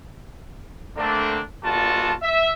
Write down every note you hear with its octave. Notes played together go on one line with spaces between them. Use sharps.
D3 A3 A#3 C4 D4
G1 A#2 F4 F#4 A5
E5